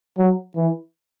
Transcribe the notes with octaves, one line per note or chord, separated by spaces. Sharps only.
F#3
E3